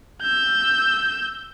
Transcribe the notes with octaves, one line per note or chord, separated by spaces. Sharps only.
E6 G6